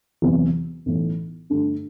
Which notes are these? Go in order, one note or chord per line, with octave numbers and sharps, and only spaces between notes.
E2 C3 F#3 B3
B1 A2 E3
G2 D3 A3